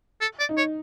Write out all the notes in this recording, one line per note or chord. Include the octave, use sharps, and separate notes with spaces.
A4
D5
D#4
C#5